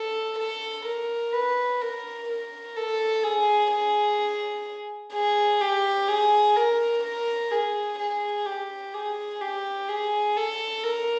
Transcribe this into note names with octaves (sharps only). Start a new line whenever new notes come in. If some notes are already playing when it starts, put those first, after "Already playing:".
Already playing: A4
A4
A#4
B4
A#4
A#4
A4
G#4
G#4
G#4
G4
G#4
A#4
A#4
G#4
G#4
G4
G#4
G4
G#4
A4
A#4